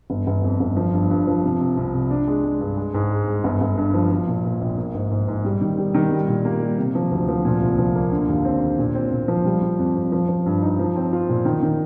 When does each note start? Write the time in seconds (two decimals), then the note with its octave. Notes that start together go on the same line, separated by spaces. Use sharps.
0.10 G1
0.27 G1
0.44 F2
0.60 G1
0.77 F3
0.93 G2
1.10 G2
1.27 F3
1.44 C3
1.61 C3
1.77 C2
1.94 C3
2.10 D4
2.27 G#3
2.44 G#3
2.60 G2
2.77 G#3
2.94 G#2
3.11 G#3
3.28 G#3
3.44 G1
3.61 G1
3.77 G2
3.94 F3
4.11 F3
4.28 A#2
4.44 A#2
4.61 A#1
4.77 A#3
4.94 G#2
5.11 G#2
5.28 G#2
5.44 G3
5.61 D#3
5.78 G3
5.94 D#3
6.11 G3
6.28 A#2
6.45 A#3
6.62 G3
6.78 C3
6.95 F3
7.11 D2
7.29 F3
7.45 A#2
7.61 C2
7.78 F3
7.95 A#3
8.12 D3
8.28 D#2
8.45 C4
8.61 D3
8.79 A#2
8.95 C4
9.11 A#2
9.28 F3
9.45 G3
9.62 G3
9.79 F2
9.95 F2
10.12 F3
10.29 F3
10.46 G2
10.62 D#4
10.79 F3
10.96 C4
11.13 F4
11.29 A#2
11.45 D#3
11.62 D#3